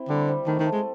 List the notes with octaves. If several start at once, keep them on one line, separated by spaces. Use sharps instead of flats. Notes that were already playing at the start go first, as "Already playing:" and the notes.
Already playing: C4 E4
D3 G3
C4
D#3 A3
D#3
A3
G#3